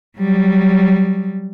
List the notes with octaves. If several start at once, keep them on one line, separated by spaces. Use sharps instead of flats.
F#3 G3